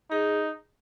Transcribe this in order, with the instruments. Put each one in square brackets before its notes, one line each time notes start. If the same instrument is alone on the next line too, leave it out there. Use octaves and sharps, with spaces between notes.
[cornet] D#4 [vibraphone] G#4